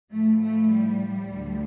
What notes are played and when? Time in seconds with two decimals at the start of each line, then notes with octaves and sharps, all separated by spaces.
0.11 A2 F3 A3
0.41 A3
0.70 G3
1.30 D2 D3 F3